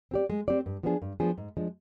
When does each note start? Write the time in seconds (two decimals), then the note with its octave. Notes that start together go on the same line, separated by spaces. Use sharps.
0.11 C4 G4 D5
0.30 G#3
0.48 C4 G4 D5
0.66 G2
0.83 F3 B3 D4 G#4
1.02 G2
1.20 F3 B3 D4 G#4
1.38 G#2
1.57 F3 G#3 D4